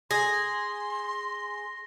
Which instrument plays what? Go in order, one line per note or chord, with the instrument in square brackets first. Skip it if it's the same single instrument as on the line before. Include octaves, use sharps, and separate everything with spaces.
[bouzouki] G#4 [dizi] C6 [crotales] A#6